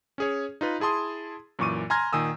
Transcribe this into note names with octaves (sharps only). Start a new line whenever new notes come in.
C#4 G#4 C#5
D#4 F4 B4
E4 G#4 A5 C6 D#6
F#2 A#2 E3 C#6 D6 D#7
G#5 A#5 C6 F6 G#6 A#6
A#2 D#3 G#5 D#6 E6